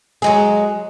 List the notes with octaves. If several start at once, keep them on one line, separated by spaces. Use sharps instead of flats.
F#3 G#3 G#4